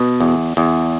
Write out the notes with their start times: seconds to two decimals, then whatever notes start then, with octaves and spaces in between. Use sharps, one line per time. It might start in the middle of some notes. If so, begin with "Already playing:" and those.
Already playing: B2
0.20 E2
0.57 E2